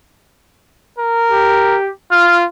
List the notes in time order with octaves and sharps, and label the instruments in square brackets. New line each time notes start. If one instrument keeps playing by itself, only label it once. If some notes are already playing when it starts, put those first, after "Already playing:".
[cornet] A#4
[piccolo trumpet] G4
[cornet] F4 [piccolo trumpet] F6